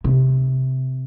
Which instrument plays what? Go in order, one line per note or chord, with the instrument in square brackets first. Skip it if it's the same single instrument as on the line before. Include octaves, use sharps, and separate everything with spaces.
[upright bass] C3